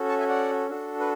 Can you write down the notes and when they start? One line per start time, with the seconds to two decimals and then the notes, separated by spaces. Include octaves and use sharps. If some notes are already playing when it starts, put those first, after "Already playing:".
Already playing: C#4 F#4 A4
0.09 A5 C#6
0.19 E5 G#5
0.29 D5 F#5
0.70 D4 F#4 A4
1.00 B4